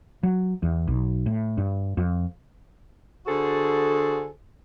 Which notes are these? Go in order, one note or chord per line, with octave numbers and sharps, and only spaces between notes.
F#3
E2
B1
A2
G2
F2
D3 F#4 G#4 A4 C5